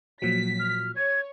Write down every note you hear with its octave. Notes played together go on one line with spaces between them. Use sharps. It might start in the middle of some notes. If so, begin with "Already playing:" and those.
A#2 F3 F#3 B6
F6
C#5 G#6